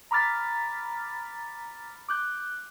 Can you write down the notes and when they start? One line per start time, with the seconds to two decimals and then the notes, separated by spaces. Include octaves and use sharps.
0.11 A#5 B5 D6 F6 A6 B6
2.09 D6 F#6 G6